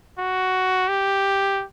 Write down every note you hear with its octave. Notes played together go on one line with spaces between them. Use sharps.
F#4
G4